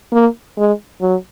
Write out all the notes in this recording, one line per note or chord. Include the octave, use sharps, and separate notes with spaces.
A#3
G#3
F#3